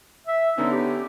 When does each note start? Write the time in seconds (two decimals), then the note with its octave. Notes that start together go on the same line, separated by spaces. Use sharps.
0.27 E5
0.58 D3 B3 C#4 D#4
0.72 G4